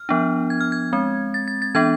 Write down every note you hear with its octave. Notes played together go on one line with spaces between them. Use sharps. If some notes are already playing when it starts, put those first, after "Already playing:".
Already playing: F6
F3 B3 D4
G#6
F6
G#6
G#3 C4
A6
A6
A6
E3 B3 D4 G#6